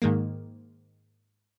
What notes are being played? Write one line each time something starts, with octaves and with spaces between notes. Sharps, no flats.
G#2 D#3 G#3 A#3